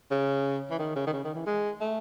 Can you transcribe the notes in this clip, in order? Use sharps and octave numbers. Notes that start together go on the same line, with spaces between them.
C#3
E3
D#3
C#3
D#3
C#3
D#3
E3
G#3
A3